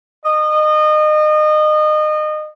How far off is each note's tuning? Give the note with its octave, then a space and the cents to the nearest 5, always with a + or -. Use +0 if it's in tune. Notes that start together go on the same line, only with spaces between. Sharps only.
D#5 -30